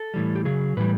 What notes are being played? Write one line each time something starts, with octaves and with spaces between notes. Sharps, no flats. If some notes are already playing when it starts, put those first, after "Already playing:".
Already playing: A4
A2 E3 G3
G4
C#3 F#3 G#4
A2 E3 G3 B4